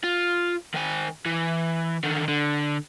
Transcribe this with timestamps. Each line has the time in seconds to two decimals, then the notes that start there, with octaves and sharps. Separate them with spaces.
0.04 F4
0.74 D#3 G#5
1.26 E3
2.04 D3 D#3
2.28 D3